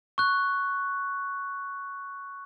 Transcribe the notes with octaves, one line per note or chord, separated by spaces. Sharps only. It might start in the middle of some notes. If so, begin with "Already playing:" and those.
C#6 F#6